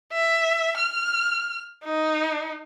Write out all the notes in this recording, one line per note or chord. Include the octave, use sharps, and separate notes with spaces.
E5
F6
D#4